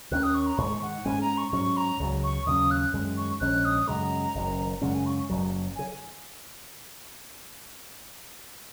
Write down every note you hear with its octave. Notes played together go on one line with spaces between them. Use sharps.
D#2 D#3 A#3 C#4 F#6
D#6
C#6
A#5
G#2 D#3 G#3 C#6
F#5
G#2 G#3 C#4 G#5
A#5
C#6
G#2 F#3 C#4 C#6
A#5
C#2 C#3 F#3
C#6
D#2 C#3 F#3 C#4 D#6
F#6
F#2 D#3 G#3 C#4
C#6
A#1 G#2 G#3 C#4 F#6
D#6
F#2 C#3 G#3 A#5
F#1 F#2 D#3
F#2 C#3 G#3 C#4 F#5
G#5
C#6
F#1 F#2 F#3
C#3 G#5